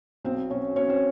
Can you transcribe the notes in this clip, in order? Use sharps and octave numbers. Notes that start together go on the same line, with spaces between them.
B1 C4 C5
B2 C#4 C#5
B1 C#4 C#5
C4 C5